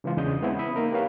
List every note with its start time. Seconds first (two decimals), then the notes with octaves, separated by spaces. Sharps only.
0.04 C#3 E3 G#3 F4
0.17 E2 C#3 D4 D#5 D#6 G6
0.42 G#3 B3 C4 E4
0.59 E5 B5 D#6
0.76 A#3 D#4 A#4
0.92 G4 B4 C#5 F5